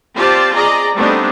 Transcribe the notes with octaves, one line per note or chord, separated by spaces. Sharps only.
C4 F4 G4 C5 D5 A5
G#4 D5 D#5 A#5
G3 A3 B3 C4 D4 D#4